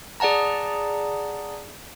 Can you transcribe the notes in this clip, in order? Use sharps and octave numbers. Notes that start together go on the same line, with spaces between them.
G#4 D5 F#5 A5 A#5